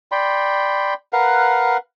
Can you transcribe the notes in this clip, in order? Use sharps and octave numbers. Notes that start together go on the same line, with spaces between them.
D5 G5 B5 C6
A#4 B4 F5 F#5